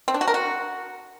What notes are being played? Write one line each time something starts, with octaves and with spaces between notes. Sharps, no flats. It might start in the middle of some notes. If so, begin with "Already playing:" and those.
C4
D4
F#4
A#4
F#4